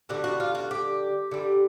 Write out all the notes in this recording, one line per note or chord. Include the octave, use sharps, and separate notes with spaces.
D3 G3 F#4
F#4
F4
F#4
G4
D3 G3